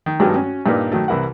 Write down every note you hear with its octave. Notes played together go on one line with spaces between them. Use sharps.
D#3
G2 D#3 F#3 G#3 A3 B3
C#4 F#4
G2 A#2 D#4 A#4 B4
D#3 F#3 A3
C2 E3 E4 A#4 F#5